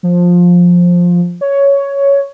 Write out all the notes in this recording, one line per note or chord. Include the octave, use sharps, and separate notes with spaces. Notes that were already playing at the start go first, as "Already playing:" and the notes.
F3
C#5